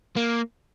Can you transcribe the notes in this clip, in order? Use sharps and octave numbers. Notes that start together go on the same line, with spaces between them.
A#3